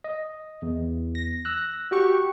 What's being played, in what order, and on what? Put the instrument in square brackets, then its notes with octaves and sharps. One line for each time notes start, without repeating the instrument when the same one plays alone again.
[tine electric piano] D#5
E2
[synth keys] A#6
[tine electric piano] E6 F#6
[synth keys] F#4 G4 C#6